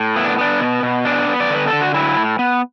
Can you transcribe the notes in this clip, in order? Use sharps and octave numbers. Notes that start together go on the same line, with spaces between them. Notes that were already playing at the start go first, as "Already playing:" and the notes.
Already playing: A2
B3 E4
D4
B3 D4
B2
B2
B3 D4
B3
D5
D3 B4
A4
D3
F#4
F#3 E4
A2
B3